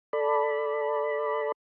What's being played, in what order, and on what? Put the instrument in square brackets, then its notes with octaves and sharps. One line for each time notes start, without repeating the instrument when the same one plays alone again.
[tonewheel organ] A4 D5 B5